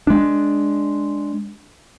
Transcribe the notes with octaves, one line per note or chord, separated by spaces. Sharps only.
G#3 D4